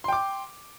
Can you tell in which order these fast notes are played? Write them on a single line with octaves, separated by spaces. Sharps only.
C6 G5 D6